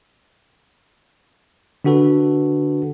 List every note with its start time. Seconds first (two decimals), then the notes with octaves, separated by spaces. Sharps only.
1.84 D3 D4 F#4 A4 B4